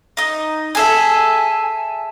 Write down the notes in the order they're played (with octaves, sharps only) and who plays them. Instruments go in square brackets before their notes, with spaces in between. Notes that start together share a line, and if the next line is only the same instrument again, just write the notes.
[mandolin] D#4 D#5
[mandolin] G#4 A4 E5 [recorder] G#5